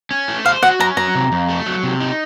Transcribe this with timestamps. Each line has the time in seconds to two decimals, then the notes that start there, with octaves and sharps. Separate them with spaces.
0.11 C#4
0.28 A3
0.45 C5 F5
0.63 F#4 F#5
0.80 C#4 A#5
0.97 F#3 A#5
1.15 C3
1.32 F2
1.48 A3
1.66 F#3
1.83 C3
2.00 D#4